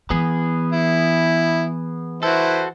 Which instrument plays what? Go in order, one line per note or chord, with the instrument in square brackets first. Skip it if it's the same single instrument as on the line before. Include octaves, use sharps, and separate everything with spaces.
[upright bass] E3 [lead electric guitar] B3 G#4
[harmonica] E4
[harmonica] E4 B4 C5 [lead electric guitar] F#4 A4